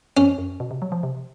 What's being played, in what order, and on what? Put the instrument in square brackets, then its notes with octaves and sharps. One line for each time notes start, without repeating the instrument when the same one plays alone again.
[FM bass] F#2 [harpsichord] C#4
[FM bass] F#2
B2
C3
F#3
F3
C3